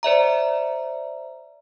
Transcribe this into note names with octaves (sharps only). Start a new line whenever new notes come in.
C5 D5 E5 A#5